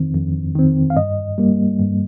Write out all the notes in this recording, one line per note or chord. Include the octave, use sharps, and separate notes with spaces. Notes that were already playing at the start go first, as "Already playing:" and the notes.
Already playing: F2 D#3 C4
F2
D#3 C4
F5
G2 D#5
G3 A#3
G2